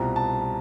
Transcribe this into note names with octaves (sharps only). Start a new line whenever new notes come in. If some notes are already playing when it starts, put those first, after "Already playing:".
Already playing: C2 B2 G3 C4 F4 A#5
A5